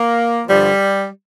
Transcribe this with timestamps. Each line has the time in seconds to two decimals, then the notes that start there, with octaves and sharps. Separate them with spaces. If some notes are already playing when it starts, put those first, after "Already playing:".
Already playing: A#3
0.47 G2 D3 F3 G3